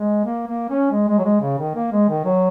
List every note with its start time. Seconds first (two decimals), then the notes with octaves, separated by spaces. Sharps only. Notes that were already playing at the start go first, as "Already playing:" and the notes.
Already playing: G#3
0.24 A#3
0.47 A#3
0.70 C#4
0.91 G#3
1.08 G#3
1.18 F#3
1.24 G#3
1.41 C#3
1.58 D#3
1.75 A#3
1.92 G#3
2.09 D#3
2.25 F#3